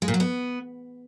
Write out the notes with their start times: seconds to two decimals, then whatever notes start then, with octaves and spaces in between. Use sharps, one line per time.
0.02 G#3
0.08 A#2
0.14 F#3
0.20 B3